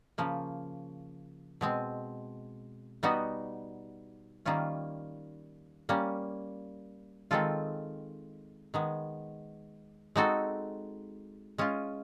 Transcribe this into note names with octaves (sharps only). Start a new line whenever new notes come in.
C#3 F3 A#3
B2 G#3 C4
G3 B3 D#4 F#4
D#3 G3 A#3 C#4 F4
G3 A#3 C#4
D#3 G#3 C4 F4 A4
D#3 G#3 B3
G#3 C4 D#4 F#4 A4
G#3 C#4 F4